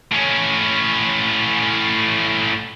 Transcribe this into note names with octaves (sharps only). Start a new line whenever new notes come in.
A2 C#4